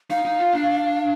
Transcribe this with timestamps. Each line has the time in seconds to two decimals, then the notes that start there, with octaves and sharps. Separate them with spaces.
0.11 D#4 F5
0.25 D#4
0.39 F4
0.53 D4